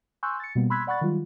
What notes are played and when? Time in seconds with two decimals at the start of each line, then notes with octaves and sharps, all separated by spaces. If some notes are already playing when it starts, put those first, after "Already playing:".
0.23 G#5 C6 C#6 E6 F#6 G6
0.40 A6 C#7
0.55 B2 G3 A#3 B3
0.70 B5 C6 E6 F#6 G#6 B6
0.87 D5 F#5 B5 C#6 F#6 A6
1.01 D#3 F#3 G3 F4